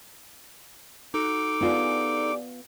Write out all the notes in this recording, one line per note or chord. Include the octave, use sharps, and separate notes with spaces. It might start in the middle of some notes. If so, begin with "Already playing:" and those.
D#4 F#4 A4 D6
B3 D4 F4 G4 G#4